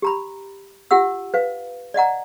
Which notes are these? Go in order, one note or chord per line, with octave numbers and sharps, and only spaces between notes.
G4 A#5 B5
F4 G4 F#5 E6
B4 F5
D5 D#5 F#5 A#5